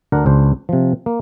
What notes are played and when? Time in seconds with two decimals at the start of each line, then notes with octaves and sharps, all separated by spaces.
0.12 D2 D4 A#4 F#5
0.26 C#2 D4 C5
0.69 C3 F3
1.06 A#3